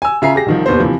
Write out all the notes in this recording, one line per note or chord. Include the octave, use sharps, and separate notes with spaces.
G#5 E6
C#3 F4 E5 G#5 A#5 C7
G4 G#4 A#6
C2 D#3 F3
F1 D#2 B3 C5
C3 E3 F3